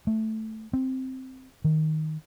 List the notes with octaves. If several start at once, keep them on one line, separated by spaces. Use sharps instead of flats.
A3
C4
D#3